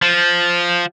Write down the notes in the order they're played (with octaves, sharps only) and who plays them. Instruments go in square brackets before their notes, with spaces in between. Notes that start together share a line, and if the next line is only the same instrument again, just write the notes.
[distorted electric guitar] F3